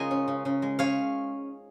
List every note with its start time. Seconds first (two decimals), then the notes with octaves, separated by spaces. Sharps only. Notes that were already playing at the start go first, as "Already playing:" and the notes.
Already playing: C#3 G#3 D#4 F4 G#4 A#4 D#5 G#5
0.11 C#4
0.28 C#3
0.45 C#3
0.62 G#3
0.79 C#4 C#5 F5